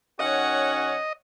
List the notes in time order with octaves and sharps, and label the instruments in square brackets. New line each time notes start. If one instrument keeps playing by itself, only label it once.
[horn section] D#3 C#4 F#4 [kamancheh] C#5 F#5 [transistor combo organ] D#5